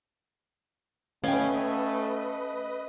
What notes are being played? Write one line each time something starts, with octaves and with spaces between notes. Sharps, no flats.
A3 C#4 B4 D#5 F5 G5